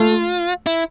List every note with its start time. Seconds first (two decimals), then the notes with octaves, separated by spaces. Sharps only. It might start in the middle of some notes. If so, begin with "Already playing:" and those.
Already playing: A3 F4
0.66 E4